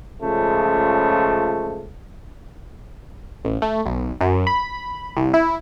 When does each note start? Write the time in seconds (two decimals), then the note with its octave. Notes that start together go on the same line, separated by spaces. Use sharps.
0.21 C#2 C#3 F3 A3
3.45 A1
3.62 A3
3.86 B1
4.21 F#2
4.47 B5
5.17 C2
5.34 E4